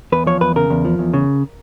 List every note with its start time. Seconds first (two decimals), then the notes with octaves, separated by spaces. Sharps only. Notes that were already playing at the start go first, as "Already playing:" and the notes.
0.12 E2 B4
0.27 F3 C#5
0.41 E2 B4
0.56 C#3 A#4
0.70 E2
0.85 F3
0.99 E2
1.14 C#3